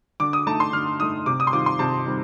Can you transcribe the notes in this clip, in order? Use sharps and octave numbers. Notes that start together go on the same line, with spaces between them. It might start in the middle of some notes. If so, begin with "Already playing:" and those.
D3 D6
D#6
A3 D#4 A5
C6
D3 F6
A3 D#4 D#6
C3 D6
D#6
C6
D#3 G3 C4 F4 D6
C6
C3 A5
D#3 G3 C4